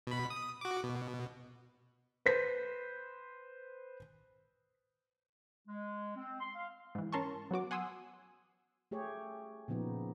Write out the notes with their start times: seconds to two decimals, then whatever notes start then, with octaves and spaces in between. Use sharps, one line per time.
0.07 B2 B5
0.30 D#6
0.61 F#4 D6
0.84 B2
2.26 B4 C5 B6
5.68 G#3
6.16 C4
6.40 C6
6.55 F5
6.95 G#2 E3
7.13 C#4 A#4 A5 C6 C#6
7.51 F#3 B3 F#4 D6
7.71 F#5 G#5 C6 D#6 E6
8.91 A3 G4 G#4 C#5
9.68 A#2 C#3 F3 B3 D#4